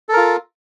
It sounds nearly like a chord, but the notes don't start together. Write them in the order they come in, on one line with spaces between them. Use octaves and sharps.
A4 A#4 F4